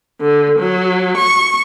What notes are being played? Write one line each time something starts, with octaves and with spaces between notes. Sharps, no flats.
D3
F#3
C#6